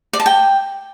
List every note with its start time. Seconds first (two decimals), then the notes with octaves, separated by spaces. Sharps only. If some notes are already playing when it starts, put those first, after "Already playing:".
0.13 D5
0.20 A5
0.26 G5